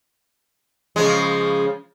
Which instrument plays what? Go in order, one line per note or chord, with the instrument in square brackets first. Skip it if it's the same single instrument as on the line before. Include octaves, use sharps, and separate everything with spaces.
[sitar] C#3 F3 G#3